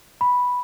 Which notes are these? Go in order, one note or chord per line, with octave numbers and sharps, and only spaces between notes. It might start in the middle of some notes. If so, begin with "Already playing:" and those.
B5